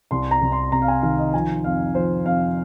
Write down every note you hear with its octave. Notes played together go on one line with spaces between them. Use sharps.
C2 C6
A#5
C2
C6
C3 A#5
F5
G#5
D#3 F5
D#5
F3 G#5
F2 F5
F3 C5
F2 F5